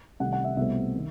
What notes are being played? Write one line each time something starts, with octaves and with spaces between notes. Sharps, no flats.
C2 C3 D#3 A3 F#5
F#5
E5
C2 B2 A3 C4 E5
D#3